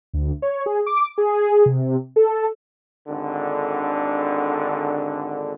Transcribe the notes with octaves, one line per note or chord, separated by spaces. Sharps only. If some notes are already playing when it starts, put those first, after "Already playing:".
D2
C#5
G#4
D6
G#4
C3
A4
G#1 D3